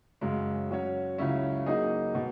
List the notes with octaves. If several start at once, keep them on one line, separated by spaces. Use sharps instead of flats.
F#2 C#3 G#3
F#3 C#4 F#4 C#5
C#2 C#3 F#3 C#4 E4
F#3 A#3 D#4 G#4 D#5
B2 F#3